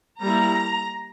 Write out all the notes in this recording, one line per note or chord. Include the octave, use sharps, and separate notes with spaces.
G3 A#3 E4 A#5